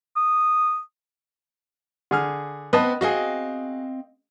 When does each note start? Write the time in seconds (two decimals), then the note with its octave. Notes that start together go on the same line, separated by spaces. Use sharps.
0.16 D#6
2.11 D3 G#4 F6
2.73 B3 C4 B4 D#5 A5
3.01 C4 F#4 G#4 D#5 F5